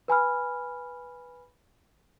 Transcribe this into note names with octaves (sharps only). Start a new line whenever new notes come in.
B4 G#5 B5 F6